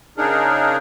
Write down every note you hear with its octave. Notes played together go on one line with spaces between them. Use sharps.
C#3 D4 D#4 G#4 A#4